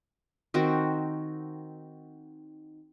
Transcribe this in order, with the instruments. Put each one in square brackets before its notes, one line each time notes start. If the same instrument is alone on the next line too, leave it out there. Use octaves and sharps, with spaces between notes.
[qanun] D#3 C4 F#4